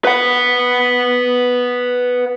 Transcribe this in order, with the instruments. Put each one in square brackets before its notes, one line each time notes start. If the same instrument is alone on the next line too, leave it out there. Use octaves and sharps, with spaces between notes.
[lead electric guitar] B4 F#5